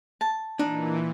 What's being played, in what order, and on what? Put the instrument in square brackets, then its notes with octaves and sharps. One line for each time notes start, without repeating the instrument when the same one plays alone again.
[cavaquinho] A5
[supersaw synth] A#2 E3 [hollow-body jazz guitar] D4 D#4